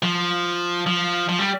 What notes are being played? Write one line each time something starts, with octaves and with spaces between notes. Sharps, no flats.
F3
F3
F3
G3